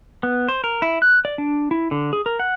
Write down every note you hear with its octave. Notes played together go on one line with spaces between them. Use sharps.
B3
C5
A#4
E4
F#6
D5
D4
E4
D3
G#4
A#4
F#5